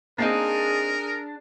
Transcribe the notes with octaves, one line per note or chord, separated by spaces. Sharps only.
A#3 C4 D4 D#4 G#4 A#4